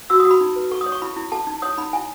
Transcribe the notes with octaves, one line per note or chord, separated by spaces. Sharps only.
F#4 E6
D#6
F#4
B5
D#4
B4
A4 C#6
D#6
C#5
C#6
E4 B5
E4
A4 A5
D#4
C#5 D#6
D#4 B5
E4 G#5